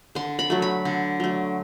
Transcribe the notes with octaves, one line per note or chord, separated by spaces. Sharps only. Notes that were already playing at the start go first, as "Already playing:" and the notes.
D3 C6
B5
F#3 A3
B5
D3
F#3 A3